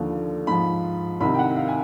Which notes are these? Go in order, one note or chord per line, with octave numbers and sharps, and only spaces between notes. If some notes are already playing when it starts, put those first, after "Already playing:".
Already playing: D#2 D3 F3
G#2 F3 B5
C2 C3 D#3 B5
G5
F#5
F5
G#5